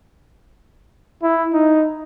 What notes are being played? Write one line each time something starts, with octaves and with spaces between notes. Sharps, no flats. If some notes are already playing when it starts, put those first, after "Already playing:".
E4
D#4